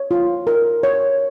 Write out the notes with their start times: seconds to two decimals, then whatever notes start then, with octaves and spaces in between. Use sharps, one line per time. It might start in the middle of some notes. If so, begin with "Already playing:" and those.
Already playing: C#5
0.11 F4
0.47 A#4
0.83 C#5